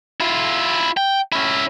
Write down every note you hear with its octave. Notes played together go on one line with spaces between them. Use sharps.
E4 F4
G5
C#4 E4